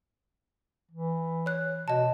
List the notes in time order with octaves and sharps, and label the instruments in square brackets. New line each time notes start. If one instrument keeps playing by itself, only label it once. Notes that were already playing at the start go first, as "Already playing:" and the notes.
[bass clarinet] E3
[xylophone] C#5 F#6
[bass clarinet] B2 [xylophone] D#5 A5